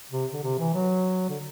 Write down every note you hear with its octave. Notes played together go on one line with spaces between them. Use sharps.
C3
D3
C3
E3
F#3
D3